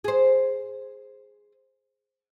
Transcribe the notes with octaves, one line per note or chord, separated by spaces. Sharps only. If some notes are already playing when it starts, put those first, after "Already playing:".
G#4 C5